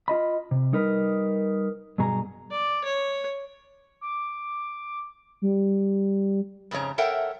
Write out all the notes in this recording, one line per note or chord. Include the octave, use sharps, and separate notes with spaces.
F4 D#5 B5
C3
G3 D#4 A#4 B4
G2 B2 F#3 G#4 A#5
D5
C#5
D6
G3
F2 G#2 C#3 C#5 A#5
A4 A#4 C#5 E5 F#5 G5